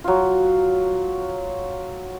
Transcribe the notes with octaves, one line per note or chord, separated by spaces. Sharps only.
F#3 F4